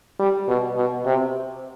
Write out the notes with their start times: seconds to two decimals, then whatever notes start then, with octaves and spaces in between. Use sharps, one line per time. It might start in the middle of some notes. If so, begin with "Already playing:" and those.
0.19 G3
0.48 B2
0.76 B2
1.06 C3